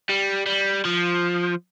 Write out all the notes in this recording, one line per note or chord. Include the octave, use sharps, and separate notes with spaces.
G3
G3
F3